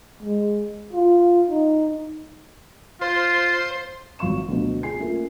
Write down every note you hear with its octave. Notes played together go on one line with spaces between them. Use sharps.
G#3
F4
D#4
F4 C5
G#1 F#3 F5 C#6 E7
D2 B2 F#3
G#4 G#5 C7
A3 A#3 C#4 F4